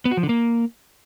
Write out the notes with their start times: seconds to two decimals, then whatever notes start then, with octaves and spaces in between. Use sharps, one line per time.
0.05 B3
0.11 F#4
0.17 F3
0.23 D3
0.29 A#3